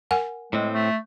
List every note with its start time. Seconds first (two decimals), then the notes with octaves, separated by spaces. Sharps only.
0.11 A#4 F#5 G#5
0.53 A2 G#3 C4
0.73 A3